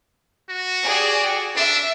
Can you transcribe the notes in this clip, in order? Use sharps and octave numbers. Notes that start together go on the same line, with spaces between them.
F#4
G4 G#4 D5
D4 E5